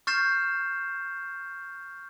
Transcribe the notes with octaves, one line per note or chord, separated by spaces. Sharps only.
C#6 F6 G6 A6 C7 E7